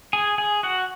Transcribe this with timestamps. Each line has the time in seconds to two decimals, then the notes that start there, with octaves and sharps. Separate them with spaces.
0.13 G#4 G#5
0.38 G#4 G#5
0.63 F#4 F#5